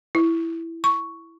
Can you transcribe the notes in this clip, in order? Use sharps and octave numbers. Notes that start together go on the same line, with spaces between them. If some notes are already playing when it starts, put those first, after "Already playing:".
E4
C#6